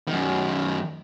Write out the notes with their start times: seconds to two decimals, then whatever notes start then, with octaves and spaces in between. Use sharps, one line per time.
0.08 F#2 D#3